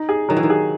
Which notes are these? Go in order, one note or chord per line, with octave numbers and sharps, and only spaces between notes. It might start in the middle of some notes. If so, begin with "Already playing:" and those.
Already playing: D#4
G#4
D#3 F#3
E3
D#3
G#4